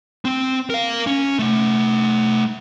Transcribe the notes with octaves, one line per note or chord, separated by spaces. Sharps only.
C4
A#4 F5
C#4
A3 D#4